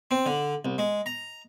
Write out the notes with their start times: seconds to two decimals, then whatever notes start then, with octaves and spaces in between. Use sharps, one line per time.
0.11 C4
0.26 D3
0.65 C2
0.78 G#3
1.06 A#5